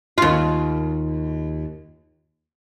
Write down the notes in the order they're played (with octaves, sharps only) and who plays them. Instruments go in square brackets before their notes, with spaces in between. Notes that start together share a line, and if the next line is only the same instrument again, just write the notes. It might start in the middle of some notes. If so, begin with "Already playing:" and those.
[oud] D#2 F4